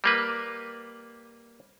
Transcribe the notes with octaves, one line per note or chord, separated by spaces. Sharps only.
G3 A#3 B4